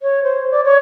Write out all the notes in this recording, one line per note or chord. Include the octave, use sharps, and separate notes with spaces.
C#5
C5
D5
C#5